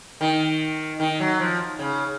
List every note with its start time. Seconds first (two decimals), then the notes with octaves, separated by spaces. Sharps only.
0.21 D#3
1.00 D#3
1.20 F#3
1.40 F3
1.79 C#3